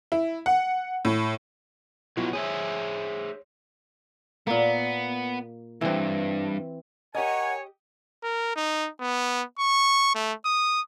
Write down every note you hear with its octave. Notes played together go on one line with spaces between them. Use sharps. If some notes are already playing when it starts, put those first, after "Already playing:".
E4
F#5
A2
B2 F#3 B3 E4 F4
G#4 C5 C#5 E5
A#2 A#3 B3
C2 G2 E3 C4
G4 A#4 C#5 D#5 F#5 G#5 A#5
A#4
D#4
B3
C#6
A3
D#6